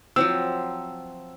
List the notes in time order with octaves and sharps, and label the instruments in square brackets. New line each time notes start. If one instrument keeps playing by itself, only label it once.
[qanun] F3 F#3 C4 [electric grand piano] E6